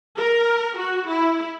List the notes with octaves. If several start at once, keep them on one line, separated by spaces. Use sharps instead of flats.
A#4
F#4
E4